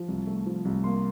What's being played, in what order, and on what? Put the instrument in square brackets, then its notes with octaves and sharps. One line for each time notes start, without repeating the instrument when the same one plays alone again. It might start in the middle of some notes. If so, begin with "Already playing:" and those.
Already playing: [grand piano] F3
C2
A3
F3
C2
A#3 C6